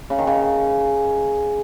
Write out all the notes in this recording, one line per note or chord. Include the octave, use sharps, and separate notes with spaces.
C#3
D#3
C#3